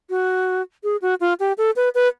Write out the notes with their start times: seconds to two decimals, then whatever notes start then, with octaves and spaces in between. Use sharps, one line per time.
0.10 F#4
0.84 G#4
1.02 F#4
1.21 F4
1.40 G4
1.58 A4
1.76 B4
1.95 B4